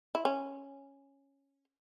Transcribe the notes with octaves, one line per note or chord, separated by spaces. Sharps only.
E4
C#4